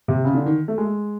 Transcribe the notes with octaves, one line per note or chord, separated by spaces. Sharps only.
C3
C#3
D3
D#3
A3
G#3